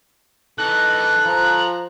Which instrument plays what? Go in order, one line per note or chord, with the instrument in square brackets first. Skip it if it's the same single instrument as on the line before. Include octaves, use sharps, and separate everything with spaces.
[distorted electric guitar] E3 D#4 [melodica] A4 [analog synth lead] F#6
[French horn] F3 [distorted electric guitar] A#5